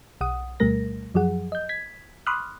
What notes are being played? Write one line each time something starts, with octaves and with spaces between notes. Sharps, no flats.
B1 F#5 D#6
D2 B2 G3 A3 A#4 A#6
F#2 F3 F#3 G#4 F#5
D#5 G6
G#6 B6
B5 C6 D6 D#6 F6 F#6